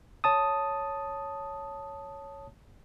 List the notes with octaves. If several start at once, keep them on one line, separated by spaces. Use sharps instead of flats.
C#5 A5 D#6